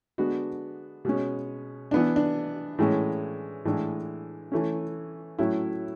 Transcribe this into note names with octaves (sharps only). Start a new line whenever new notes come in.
D3 G#3 B3 D4 F#4
B2 G#3 C#4
E3 B3 D4
D4
A2 E3 G#3 C#4
A2 E3 G#3 D4
E3 A3 C#4
A2 F#3 C#4 E4